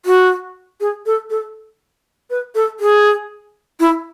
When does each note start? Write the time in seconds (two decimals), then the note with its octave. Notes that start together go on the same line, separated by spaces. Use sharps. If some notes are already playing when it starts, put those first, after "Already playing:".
0.06 F#4
0.80 G#4
1.06 A4
1.30 A4
2.30 B4
2.55 A4
2.80 G#4
3.80 E4